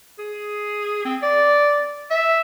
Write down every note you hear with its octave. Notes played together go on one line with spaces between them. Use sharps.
G#4
C4
D5
E5